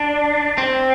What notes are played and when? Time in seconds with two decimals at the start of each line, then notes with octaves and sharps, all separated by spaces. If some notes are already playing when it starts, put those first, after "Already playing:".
Already playing: D4
0.58 C4